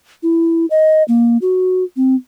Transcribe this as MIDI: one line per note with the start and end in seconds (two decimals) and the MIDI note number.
0.23 0.66 64
0.71 1.03 75
1.08 1.37 58
1.42 1.84 66
1.96 2.15 60